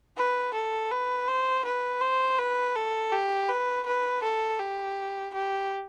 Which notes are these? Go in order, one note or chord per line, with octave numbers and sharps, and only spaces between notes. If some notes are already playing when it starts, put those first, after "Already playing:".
B4
A4
B4
C5
B4
C5
B4
A4
G4
B4
B4
A4
G4
G4